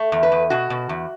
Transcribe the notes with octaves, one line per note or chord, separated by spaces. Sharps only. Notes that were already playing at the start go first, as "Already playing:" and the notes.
Already playing: A3
E2
B4
E2
B2 F#4
B2
E2